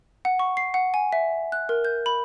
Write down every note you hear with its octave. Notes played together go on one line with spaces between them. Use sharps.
F#5
C#6
C7
F#5
G#5
E5
F#6
A#4
G6
B5